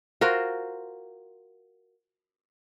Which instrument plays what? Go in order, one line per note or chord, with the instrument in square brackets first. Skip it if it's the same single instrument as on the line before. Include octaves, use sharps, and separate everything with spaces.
[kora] F4 F#4 A#4 C5